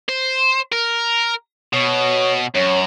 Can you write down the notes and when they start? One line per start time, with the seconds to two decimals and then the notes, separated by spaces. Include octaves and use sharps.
0.09 C5
0.73 A#4
1.73 B2 C#5
2.55 F#2 C#5